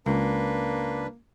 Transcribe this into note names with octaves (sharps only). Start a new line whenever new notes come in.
C#2 A#3 D4 B4